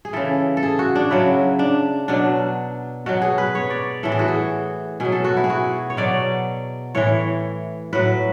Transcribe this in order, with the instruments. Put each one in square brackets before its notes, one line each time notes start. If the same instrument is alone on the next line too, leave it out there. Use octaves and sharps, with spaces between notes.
[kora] G#4
C#3 E3 A4
A4
G#4
F#4
D4
C#3 F#3 E4
D4
B2 F#3 D4
B2 F#3 F#4
G#4
B4
C#5
D5
A2 E3 A4
G#4
F#4
G#4
B2 F#3 G#4
A4
F#4
E4
G#4
F#4
C#5
B2 F#3 D5
A2 E3 C#5
A2 F#3 B4